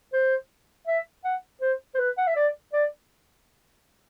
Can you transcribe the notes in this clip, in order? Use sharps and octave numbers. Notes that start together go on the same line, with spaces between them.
C5
E5
F#5
C5
C5
B4
F#5
E5
D5
D5